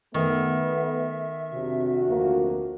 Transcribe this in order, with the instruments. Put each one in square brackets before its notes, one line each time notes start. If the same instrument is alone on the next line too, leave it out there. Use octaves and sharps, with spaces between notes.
[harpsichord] D#3 [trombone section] A3 B3 [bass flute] E5
[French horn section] F2 D4 F#4 [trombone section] C3
[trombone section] D2 F3 A#3